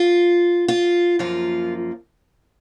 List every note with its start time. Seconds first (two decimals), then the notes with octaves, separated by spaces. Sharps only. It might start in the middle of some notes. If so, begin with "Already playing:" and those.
Already playing: F4
0.68 F4
1.19 F#2 F3 A#3 F4